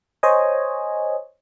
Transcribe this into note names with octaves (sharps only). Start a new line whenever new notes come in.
C5 C#5 D#5 G#5